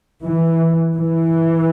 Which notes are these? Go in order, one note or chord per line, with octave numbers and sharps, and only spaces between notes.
E3
E3